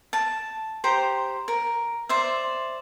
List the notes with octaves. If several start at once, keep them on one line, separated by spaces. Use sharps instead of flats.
A5
G4 C5 G5 A#5
A#4
C5 D5 E5